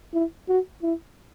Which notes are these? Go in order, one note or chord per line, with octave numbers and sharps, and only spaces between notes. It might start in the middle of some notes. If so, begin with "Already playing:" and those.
E4
F#4
E4